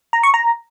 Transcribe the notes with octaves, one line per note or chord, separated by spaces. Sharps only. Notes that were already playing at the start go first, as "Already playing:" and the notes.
A#5
C#6
A#5